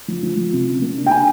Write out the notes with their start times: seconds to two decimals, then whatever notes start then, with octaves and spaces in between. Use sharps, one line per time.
0.08 F3
0.23 F3
0.37 F3
0.52 C3
0.67 C#3
0.81 A#3
0.97 D4
1.06 G5
1.10 D4 G#5